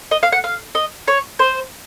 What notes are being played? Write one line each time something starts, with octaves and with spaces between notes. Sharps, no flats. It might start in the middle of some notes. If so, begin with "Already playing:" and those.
D#5
F5
F#5
F5
D#5
C#5
C5